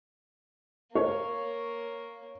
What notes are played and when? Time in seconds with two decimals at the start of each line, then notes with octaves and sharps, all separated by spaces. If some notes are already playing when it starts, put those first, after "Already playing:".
0.95 A#3 C#5